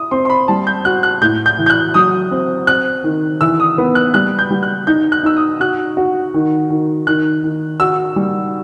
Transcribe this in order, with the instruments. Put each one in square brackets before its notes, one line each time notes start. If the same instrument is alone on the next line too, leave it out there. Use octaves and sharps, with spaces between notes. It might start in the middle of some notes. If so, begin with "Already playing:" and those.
Already playing: [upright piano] E4 [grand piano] D#6
[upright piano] C4 [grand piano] C6
[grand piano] C6
B5
[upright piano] G3 [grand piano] A5
[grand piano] G6
[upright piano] F#4 [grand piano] F#6
[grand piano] F#6
[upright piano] A2 [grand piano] G6
[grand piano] G6
[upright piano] E3
[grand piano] G6
F#6
[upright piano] F#3 [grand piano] D#6
[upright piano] C4
[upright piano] C4 [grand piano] F#6
[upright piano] D#3
[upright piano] E3 [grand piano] E6
[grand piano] D#6
[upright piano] B3
[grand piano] F#6
[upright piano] G3 [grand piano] F#6
[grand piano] G6
[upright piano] G3
[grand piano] F#6
[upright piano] D#4 [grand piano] G6
[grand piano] F#6
[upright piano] D#4 [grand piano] E6
[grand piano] D#6
[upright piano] F#4 [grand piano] F#6
[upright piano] F#4
D#3
D#3
[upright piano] D#3 [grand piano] F#6
[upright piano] D#3
[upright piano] F#4 [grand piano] E6
[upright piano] G3